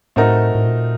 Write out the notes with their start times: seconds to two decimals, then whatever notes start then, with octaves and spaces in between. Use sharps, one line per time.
0.16 A2 A3 C4 D#4 F#4 A#4
0.55 A2
0.66 A#2